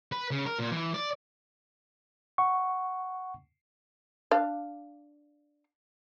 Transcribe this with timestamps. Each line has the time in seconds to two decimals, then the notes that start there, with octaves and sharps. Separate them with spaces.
0.12 B4
0.31 C#3
0.46 A#4
0.59 A#2
0.71 E3
0.94 D5
2.38 F#5 C#6
4.31 D4 F5